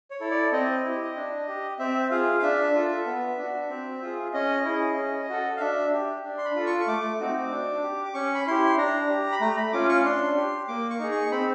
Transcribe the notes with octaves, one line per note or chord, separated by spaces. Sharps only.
C#5
E4 A4
D5
C4 D#5
E4 G4
D4
G4
C4 E5
F4 G#4 F5
F5
D4 E5
F4 A4
B3
D4 F#4
C4
F4 G#4
C#4 D#5
E4 G#4
C#4
F#4 A4
F5
D4 E5
G4
D4
C6
B5
F4 A4
C#6
C#6
A3 D6
C4 D#4 F#4
D4
G4
D6
C#4 C#6
B5
E4 G4 C6
D4 A#5
G4
B5
A3 A#5
B5
C#4 F4 D6
C#6
D4 C6
G4
A#3 D6
C#6
D#4 G#4
C#6
C4 B5